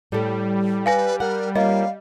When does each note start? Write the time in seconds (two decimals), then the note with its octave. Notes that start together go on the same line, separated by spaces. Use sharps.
0.12 A2 G3 A4
0.86 B4 F5 G#5 A#6
1.20 A#4 F#5
1.56 A#3 C#4 F4 D#5 F5